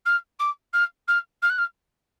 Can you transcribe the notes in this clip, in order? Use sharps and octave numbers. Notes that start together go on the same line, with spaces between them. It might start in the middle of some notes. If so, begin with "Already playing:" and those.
F6
D6
F6
F6
F6
F#6
F6